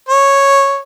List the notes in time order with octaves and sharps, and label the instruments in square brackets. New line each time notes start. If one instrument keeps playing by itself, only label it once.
[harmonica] C#5